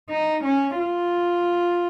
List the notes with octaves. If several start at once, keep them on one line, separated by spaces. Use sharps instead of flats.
D#4
C#4
F4